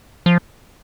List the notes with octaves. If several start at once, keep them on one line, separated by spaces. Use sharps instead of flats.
F3